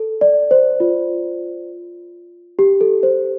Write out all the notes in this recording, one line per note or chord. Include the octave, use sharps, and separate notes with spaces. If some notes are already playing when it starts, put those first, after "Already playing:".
Already playing: A4
D5
C5
F4
G4
A4
C5